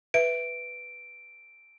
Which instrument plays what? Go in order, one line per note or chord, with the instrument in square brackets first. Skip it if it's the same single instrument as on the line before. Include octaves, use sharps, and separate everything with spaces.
[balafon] B4 E5 [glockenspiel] D7